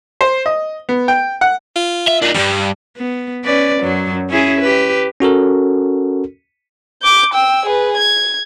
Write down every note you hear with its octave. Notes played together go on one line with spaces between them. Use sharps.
C5
D#5
B3
G5
F#5
F4
E5
A#2 D4 D#4
E2 G2 G3
B3
C#4 B4 D5
F#2 F#3
C#4 E4 G#4
G4 B4
C#4 F#4 A4 A#4
D6 G6
G5 E6
G#4 B4
G#6